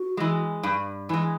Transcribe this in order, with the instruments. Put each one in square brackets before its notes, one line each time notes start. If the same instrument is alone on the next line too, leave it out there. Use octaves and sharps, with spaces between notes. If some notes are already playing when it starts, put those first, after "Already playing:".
Already playing: [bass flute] F#4
[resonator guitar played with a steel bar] E3 G#3
G2
E3 G#3